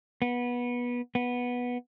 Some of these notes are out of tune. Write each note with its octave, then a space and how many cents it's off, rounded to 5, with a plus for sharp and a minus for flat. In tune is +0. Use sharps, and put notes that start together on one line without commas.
B3 -20
B3 -10